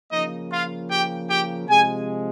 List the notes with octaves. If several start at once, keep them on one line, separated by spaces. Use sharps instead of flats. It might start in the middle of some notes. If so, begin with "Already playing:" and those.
C#3 F3 A#3 D#4 D#5
F4 F5
G4 G5
G4 G5
C3 F3 G#3 G#4 G#5